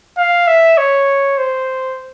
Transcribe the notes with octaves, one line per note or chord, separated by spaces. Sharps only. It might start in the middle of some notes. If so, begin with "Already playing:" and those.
F5
E5
C#5
C5